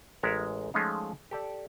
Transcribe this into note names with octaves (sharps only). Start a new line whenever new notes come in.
A1 G#3 A#4 E5 F#5 A#5
F3 G#3 A3 C#4 D#4 F4
G4 A4 D5